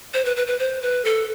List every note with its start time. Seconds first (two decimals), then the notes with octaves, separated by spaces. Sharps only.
0.14 C5
0.25 B4
0.36 B4
0.47 B4
0.59 C5
0.82 B4
1.05 A4